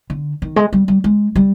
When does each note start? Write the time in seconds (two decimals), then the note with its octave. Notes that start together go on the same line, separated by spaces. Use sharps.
0.10 D3
0.42 D#3
0.56 G#3
0.73 G3
0.88 G3
1.04 G#3
1.35 G3